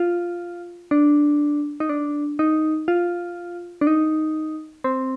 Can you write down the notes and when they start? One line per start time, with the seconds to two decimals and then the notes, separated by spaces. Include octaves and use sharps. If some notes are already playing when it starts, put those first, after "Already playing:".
Already playing: F4
0.91 D4
1.80 D#4
1.89 D4
2.39 D#4
2.88 F4
3.81 D4
3.87 D#4
4.84 C4